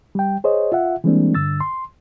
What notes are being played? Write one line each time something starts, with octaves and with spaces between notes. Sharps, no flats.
G3 G5
G#4 C5 C#5 D#5
F4 E5 F#5
E3 G3 G#3 A#3 C4 D4
G2 D3 E6 A6
C6